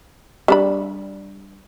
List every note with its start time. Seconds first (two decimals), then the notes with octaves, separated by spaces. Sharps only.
0.48 G3 D4 B5